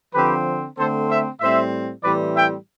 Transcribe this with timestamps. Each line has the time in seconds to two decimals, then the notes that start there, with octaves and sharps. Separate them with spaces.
0.13 D3 F3 C4 G4 B4
0.77 D3 A3 C4 A4 C5
1.09 C5 E5
1.40 A2 G3 C4 C5 E5
2.04 A2 E3 G3 C4 B4 D5
2.36 E5 G5